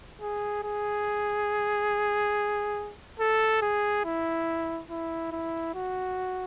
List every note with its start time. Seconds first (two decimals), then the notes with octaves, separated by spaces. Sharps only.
0.21 G#4
0.64 G#4
3.20 A4
3.62 G#4
4.05 E4
4.90 E4
5.32 E4
5.74 F#4